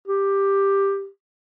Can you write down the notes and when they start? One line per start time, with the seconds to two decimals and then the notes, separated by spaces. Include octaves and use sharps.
0.07 G4